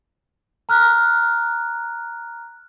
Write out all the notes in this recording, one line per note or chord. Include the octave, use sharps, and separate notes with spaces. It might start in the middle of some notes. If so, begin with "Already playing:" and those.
A#5 F6 F#6